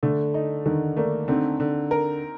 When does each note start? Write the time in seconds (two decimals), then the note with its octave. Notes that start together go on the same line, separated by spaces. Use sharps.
0.03 D3 A3
0.34 D#4
0.66 D3 D#3
0.97 A3 A#3 D4
1.28 D3 C4 D#4
1.60 D3
1.91 A#4